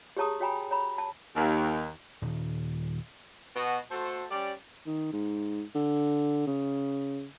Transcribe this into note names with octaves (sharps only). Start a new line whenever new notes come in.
G4 G#4 C#5 A5 A#5 D#6
F#4 C#5 G5 G#5 A#5 B5
C#5 A#5 B5
A5
D#2
D#1
B2 B3 F#4
A3 F#4 A4 C5
G3 C#4 G4 D5
D#3
G#2
D3
C#3